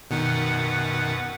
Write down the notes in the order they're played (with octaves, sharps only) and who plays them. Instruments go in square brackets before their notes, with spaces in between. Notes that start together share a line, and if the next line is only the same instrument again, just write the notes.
[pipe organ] F#2 B4 F#5 [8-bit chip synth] B2 D#3